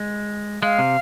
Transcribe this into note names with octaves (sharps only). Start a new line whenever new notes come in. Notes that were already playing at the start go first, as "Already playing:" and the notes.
Already playing: G#3
G#3 F5
C3